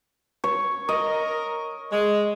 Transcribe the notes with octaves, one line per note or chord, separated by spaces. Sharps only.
C#5
A#4 D#5
G#3